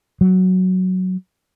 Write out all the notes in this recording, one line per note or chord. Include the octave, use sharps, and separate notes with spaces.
F#3